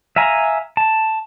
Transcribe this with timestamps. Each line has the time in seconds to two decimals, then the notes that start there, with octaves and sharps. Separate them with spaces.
0.16 E5 F5 G#5 A#5
0.77 A5